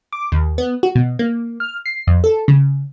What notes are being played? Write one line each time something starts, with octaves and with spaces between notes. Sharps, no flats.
D6
D#2
B3
F#4
B2
A#3
F6
C7
F2
A4
C#3